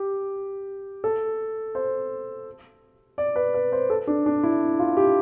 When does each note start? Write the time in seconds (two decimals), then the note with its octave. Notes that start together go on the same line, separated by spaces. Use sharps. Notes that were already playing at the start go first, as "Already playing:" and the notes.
Already playing: G4
1.04 A4
1.75 C5
3.18 D5
3.36 B4
3.54 B4
3.72 C5
3.90 A4
4.07 D4
4.26 D4
4.43 E4
4.79 F4
4.97 G4